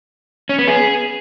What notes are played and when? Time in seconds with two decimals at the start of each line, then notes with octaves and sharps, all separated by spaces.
0.49 C#4
0.58 B3
0.68 G#4